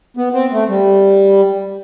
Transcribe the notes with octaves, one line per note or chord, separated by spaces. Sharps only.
B3
C4
A3
G3